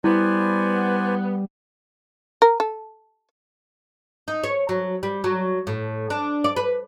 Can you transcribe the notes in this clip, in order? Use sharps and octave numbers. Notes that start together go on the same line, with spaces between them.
G3 B3 E4 C5 D5 G#5
A#4
A4
D#4
C#5
F#3
G3
F#3
A2
D4
D5
B4